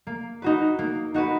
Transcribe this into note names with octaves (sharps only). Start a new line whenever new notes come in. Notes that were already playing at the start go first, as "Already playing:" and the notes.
A#3
D#4 F#4 B4
A#3
D#4 F#4 B4